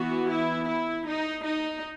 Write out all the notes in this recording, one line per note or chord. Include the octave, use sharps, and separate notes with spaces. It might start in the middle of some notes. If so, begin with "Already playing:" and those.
Already playing: E3 B3 F#4
E4
E4
D#4
D#4